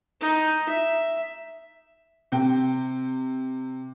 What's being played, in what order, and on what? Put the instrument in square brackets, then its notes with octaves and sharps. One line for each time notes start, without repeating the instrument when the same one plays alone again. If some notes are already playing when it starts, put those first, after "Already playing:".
[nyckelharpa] D#4
E5
[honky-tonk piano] C3 G5